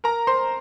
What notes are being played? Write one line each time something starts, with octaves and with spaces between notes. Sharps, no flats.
A#4 A#5
C5 C6